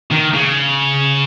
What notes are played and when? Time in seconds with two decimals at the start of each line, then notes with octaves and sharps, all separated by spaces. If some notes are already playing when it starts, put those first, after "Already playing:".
0.11 D#3
0.34 C#3